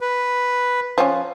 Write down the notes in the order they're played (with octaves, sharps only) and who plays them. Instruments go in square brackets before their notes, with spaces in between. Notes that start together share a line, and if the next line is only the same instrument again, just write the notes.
[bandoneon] B4
[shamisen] F3 C#4